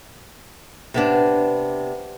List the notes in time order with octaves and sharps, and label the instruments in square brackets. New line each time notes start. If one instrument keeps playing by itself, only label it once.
[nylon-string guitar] C3 B3 D4